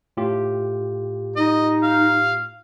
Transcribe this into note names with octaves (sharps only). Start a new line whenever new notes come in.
A2 F4 G4
D#4 D#5
F5